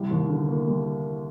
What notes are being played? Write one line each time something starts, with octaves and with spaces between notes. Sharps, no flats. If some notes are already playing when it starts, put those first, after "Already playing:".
Already playing: C2 G3
D#2
D3
A#3
G3